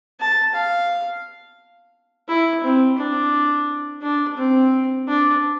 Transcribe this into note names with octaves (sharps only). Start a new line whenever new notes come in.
A5
F5
E4
C4
D4
D4
C4
D4